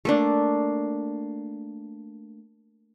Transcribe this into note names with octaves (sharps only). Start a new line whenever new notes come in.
A3 A#3 D4